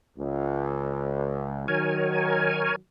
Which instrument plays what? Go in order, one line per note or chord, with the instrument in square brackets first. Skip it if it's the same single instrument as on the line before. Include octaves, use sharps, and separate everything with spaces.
[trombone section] C#2
[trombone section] D#3 F#3 [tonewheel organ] A#4 C#5 G#5